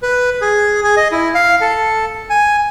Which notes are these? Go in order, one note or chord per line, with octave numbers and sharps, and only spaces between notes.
B4
G#4
G#4
D#5
E4
F5
A4
G#5